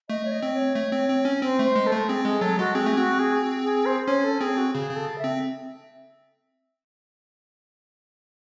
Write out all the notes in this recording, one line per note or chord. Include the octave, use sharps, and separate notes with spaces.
A3 D#5
C#5
D#5
C4
C#5
A3
C4
C4
C#4
C4 C5
A3
C5
G#3
A4
A3
C4 G#4
G#3 G#4
F#3 A4
G#3 F#4
C4 G#4
A3
C4 F#4
G#4
G#4
C5
C#4 C#5
A4
C4 G#4
F#4
C#3 G#4
C#3
A4
E5
C4